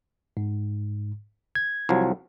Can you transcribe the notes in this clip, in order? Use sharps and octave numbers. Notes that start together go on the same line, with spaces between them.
G#2
G#6
C2 F3 F#3